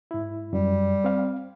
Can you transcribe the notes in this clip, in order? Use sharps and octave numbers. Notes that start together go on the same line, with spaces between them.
G#2 E4
F#2 G3
C4 F5